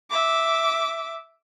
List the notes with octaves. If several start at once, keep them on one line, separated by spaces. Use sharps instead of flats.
E5 D6